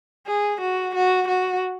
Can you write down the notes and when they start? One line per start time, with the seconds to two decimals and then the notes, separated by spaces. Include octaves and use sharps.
0.27 G#4
0.61 F#4
0.95 F#4
1.28 F#4